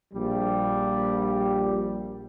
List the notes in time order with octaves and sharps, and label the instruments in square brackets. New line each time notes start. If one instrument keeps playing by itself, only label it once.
[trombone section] A#1 G3